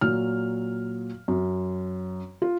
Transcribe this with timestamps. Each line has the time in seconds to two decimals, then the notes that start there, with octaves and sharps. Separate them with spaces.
0.01 A#2 F#3 F6
1.28 F#2
2.42 F4